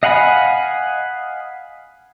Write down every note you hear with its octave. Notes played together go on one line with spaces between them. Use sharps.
D#5 F5 F#5 G#5 B5